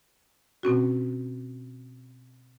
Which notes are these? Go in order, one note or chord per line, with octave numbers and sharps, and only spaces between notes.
B2 C4 C#4 F#4